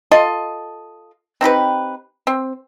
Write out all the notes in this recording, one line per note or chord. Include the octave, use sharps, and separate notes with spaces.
F4 A4 D#5
C4 D#4 G4 B4
C4